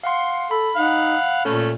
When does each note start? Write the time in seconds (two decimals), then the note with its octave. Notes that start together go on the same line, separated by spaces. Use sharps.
0.03 F5 F#5 C6
0.51 A4 B5
0.76 D#4 F5 F#5
1.45 A#2 A3 C#4